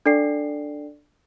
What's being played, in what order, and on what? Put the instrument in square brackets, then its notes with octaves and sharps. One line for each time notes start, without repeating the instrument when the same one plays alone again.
[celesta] D4 A4 D5 G5 C7